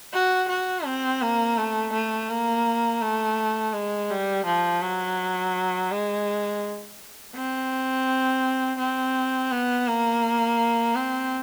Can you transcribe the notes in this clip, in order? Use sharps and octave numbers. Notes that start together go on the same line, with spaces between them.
F#4
F#4
C4
A#3
A3
A3
A#3
A3
G#3
G3
F3
F#3
G#3
C4
C4
B3
A#3
C4